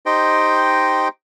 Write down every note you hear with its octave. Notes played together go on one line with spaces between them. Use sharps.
D#4 G4 C5 D#5 G5